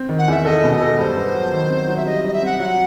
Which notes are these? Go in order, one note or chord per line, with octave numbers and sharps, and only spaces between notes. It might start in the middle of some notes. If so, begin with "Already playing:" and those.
Already playing: C4
D#3
F#5
E2 E5
A4 D#5
B2
D#5
A4
G2 C5
B3
F#3
D#3
C4
F#3
E5
G3 D#5
G3 D#5
E5
C4 F#5
F#3 F#5